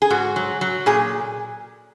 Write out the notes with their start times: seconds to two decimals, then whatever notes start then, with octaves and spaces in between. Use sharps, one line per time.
0.02 G#4
0.10 G#2 F#4
0.36 F#3
0.61 F#3
0.86 A#2 G#4